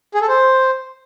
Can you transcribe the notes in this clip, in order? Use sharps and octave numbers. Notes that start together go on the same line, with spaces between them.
G#4
A4
C5